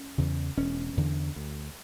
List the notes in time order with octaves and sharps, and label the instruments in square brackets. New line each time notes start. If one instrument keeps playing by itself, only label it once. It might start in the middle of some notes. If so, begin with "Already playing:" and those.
Already playing: [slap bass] C#4
E2 C#3
E1 C#4
E2 D3
D2